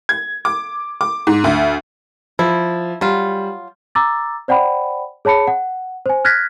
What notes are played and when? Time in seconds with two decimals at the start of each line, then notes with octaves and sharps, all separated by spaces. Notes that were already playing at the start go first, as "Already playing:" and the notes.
0.09 G#6
0.45 D6
1.01 D6
1.27 G#2
1.44 D2
2.39 F3 E4
3.01 F#3 G3 F4
3.95 A#5 D6 E6 A6
4.48 C5 D5 F#5 G5 B5
5.25 G#4 C#5 A5 B5 C#7
5.47 F#5
6.06 C5 G#5
6.25 F6 F#6 G#6 A#6 B6